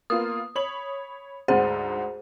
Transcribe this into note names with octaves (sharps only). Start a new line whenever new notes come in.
A#3 B3 F4 D#6
C#5 B5 F#7
D2 G#2 G#4 C5 F#5